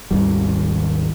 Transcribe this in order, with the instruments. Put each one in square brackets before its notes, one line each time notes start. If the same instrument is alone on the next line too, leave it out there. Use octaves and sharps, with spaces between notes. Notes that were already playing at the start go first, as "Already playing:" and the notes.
[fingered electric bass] G#1 D#2 G3